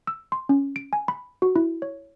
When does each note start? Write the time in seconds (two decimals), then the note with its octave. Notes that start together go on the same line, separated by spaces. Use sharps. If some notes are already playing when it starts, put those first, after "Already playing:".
0.07 E6
0.32 C6
0.49 C#4
0.76 D7
0.93 G#5
1.08 B5
1.42 F#4
1.56 E4
1.82 C#5